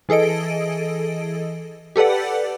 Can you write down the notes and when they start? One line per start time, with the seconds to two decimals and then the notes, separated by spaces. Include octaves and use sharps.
0.09 E3 G#4 A4 D#5 D7
1.96 G4 A4 B4 D5 F#5